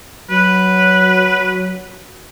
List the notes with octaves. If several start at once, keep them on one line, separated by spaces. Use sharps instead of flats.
F#3 B4